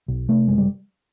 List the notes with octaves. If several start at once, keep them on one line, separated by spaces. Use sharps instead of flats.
B1
C3 A3
F#1 G#3
G3